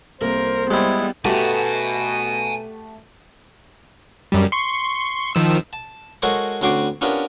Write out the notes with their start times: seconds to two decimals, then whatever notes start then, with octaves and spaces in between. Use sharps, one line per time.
0.21 C2 A#3 A4 A#4 C5
0.71 G3 G#3 B3 E4
1.25 B2 A3 F#4 G4 G#5 A#5
4.32 F#2 G3
4.52 C6 C#6
5.35 D#3 F3 E6
5.73 A5
6.22 G#3 F#4 A4 A#4 C5 C#5
6.62 D2 C4 C#4 F#4 C6 D6
7.01 B3 C#4 D4 F4 G4 A#4